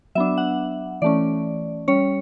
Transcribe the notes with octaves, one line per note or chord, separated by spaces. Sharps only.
F#3 B3 D4 E5
F#5
E3 A3 C#4 D5
G3 C#4 C#5